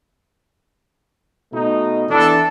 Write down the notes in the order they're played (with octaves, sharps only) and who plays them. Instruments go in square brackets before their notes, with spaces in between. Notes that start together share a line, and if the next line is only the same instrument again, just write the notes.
[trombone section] B2 A3 D#4
[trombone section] E3 B3 D4 [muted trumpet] A4